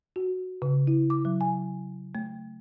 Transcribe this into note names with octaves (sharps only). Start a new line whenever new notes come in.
F#4
C#3
E4
D6
F#3
G#5
A3